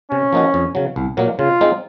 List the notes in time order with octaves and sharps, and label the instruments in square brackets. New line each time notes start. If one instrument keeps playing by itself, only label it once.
[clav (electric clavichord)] C3 [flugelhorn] C#4
[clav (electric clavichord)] F3 A#3 D#4 F#4
F2
C#3 F#3
C2
A#2 F#3 A#3
[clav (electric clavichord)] C#3 [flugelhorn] F4
[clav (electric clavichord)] G#3 C4 D#4